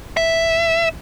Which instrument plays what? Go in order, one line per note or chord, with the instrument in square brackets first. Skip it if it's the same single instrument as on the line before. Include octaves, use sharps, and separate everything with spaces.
[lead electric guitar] E5